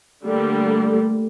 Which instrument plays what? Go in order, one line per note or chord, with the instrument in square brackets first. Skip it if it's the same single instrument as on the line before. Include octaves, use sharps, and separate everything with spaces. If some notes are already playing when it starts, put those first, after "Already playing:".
[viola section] D3 G3 A#3 [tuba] A3